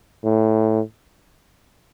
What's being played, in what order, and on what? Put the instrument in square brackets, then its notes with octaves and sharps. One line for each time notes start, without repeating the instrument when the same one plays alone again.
[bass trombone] A2